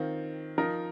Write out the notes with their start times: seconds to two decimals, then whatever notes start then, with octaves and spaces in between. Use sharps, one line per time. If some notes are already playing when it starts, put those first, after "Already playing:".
Already playing: D#3 C4 F4
0.58 F3 D#4 A#4